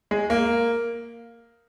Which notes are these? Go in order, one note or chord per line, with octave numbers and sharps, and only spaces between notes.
G#3
A#3